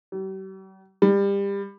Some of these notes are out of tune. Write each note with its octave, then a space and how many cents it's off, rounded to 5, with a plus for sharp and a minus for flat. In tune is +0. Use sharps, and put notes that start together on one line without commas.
G3 -45
G3 +25